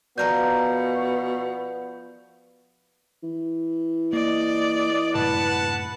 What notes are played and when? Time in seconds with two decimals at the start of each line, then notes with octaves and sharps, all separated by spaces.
0.18 B2 F3 B3 A#4 D5 G#5 G6
3.23 E3
4.13 A#3 D5 D#5
5.15 F#2 A2 C3 B4 F#5 A5